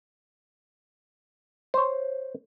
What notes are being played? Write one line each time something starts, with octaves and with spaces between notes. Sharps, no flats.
C5 C#5